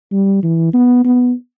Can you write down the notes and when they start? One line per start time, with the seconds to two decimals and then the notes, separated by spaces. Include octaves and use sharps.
0.12 G3
0.43 E3
0.74 B3
1.05 B3